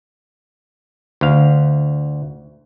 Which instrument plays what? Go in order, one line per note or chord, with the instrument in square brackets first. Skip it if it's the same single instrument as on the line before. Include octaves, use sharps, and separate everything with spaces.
[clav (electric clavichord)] D2 F5